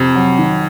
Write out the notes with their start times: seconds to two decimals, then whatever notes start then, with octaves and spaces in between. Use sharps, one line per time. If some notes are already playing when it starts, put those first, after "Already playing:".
Already playing: F2 C3
0.15 F#3
0.38 D#3